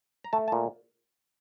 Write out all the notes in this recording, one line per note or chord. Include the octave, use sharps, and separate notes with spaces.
A#5
A3 A5
A5
A#2